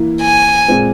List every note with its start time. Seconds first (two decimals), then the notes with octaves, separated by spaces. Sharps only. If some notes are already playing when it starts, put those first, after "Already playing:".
Already playing: E3 A#3 E4
0.22 G#5
0.68 A#2 G#3 C4